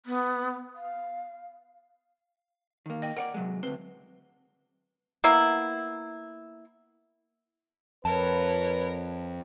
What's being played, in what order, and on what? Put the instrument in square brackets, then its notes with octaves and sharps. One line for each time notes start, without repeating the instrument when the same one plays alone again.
[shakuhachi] B3
F5
[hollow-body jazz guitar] D#3 A#3
[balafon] D#5 G5
[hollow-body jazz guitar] A#4 C#5 D5 [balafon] F#5
[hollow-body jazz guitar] C3 F#3 G#3
[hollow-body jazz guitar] D2 C4 [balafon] B4
[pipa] A#3 B3 E4
[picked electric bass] F2 [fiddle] A#4 C#5 [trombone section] B4 [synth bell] A5